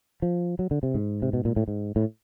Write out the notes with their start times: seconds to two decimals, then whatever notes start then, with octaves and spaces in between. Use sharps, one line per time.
0.22 F3
0.59 F#3
0.71 D3
0.83 C3
0.95 G#2
1.22 C3
1.33 B2
1.45 A#2
1.56 A2
1.68 G#2
1.96 A2